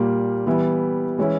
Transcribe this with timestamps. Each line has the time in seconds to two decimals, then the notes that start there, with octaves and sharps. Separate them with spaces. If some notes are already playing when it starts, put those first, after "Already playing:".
Already playing: A#2 G3 A#3
0.47 E3 G3 B3 E4
1.18 E3 G#3 C#4 E4